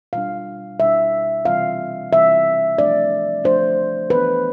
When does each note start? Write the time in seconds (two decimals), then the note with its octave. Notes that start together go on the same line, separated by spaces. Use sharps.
0.13 B2 G3 D4 F5
0.80 B2 G3 D4 E5
1.45 C3 E3 G3 C4 F5
2.12 C3 E3 G3 C4 E5
2.78 F3 A3 D4 D5
3.44 F3 A3 D4 C5
4.10 E3 B3 D4 B4